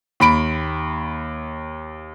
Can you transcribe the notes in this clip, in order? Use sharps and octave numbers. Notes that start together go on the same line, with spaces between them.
D#2 B5 D7